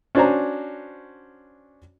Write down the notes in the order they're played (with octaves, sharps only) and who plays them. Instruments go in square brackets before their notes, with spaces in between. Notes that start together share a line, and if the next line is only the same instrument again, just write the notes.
[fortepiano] C#4 D4 F#4 C5 G#5 A#5